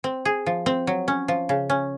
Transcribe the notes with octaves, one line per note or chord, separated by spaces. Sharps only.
C4
G#4
F3
C4
F#3
C#4
F3
C#3
C#4